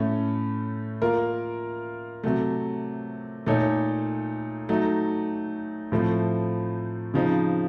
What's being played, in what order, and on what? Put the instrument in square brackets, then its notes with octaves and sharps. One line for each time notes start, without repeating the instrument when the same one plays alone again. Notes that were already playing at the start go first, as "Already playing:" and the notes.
Already playing: [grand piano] A2 A3 C#4
A#3 F4 A#4
C3 F#3 A3
A#2 A3 D#4 A4 C#5
F#3 A3 D#4
A2 F3 A3 C4
C#3 F3 C4 D#4